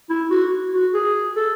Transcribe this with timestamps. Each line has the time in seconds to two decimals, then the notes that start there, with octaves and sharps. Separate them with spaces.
0.10 E4
0.31 F#4
0.73 F#4
0.94 G#4
1.36 A4